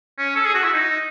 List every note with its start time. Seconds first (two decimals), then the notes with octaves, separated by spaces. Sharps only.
0.18 C#4
0.36 A4
0.45 G#4
0.54 F#4
0.64 E4
0.73 D#4